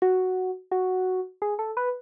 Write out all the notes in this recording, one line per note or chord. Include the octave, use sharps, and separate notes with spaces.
F#4
F#4
G#4
A4
B4